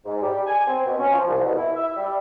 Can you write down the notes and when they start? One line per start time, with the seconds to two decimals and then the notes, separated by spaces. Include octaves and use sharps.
0.06 G#2
0.22 G3
0.47 G#5
0.67 C4
0.85 B2
0.98 C#4
1.12 F3
1.29 C2
1.45 B2
1.57 E4
1.76 E5
1.96 G3